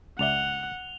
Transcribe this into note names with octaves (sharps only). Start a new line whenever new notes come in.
C#2 D5 E5 F#5 F7 G7